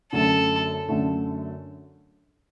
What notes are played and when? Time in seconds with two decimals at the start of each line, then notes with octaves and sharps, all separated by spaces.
0.12 F#2 D3 A3 A4
0.88 F#2 D3 A3